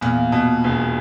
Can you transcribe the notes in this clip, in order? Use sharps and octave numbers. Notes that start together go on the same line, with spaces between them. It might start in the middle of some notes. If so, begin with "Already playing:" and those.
E2 A#2
B2
E1